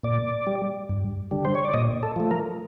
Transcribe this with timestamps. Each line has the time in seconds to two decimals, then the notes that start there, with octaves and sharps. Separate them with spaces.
0.03 A#2 D5
0.47 G3
0.89 G2
1.31 D3 G3
1.45 C5
1.55 C#5
1.65 D5
1.74 A#2 D#5
2.03 A4
2.16 F3 A3
2.31 A#4